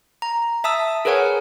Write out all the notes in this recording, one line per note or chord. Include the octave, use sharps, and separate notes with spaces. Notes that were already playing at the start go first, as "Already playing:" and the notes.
A#5
E5 A5 D#6 E6
G#4 A#4 B4 C#5 F#5 G#5